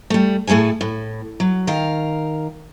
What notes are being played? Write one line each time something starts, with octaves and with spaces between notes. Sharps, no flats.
G3 A3
A2 A3 G#4 A4 G#5
A2
F#3
D#3 A#4 F5